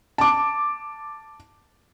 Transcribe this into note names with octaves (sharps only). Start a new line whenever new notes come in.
A5 D6